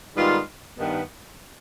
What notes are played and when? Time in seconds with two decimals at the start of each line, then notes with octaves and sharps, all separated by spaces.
0.15 G#2 D#3 G3 B3 F4
0.78 G2 D#3 B3